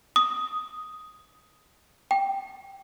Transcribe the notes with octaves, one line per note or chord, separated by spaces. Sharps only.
D#6
G5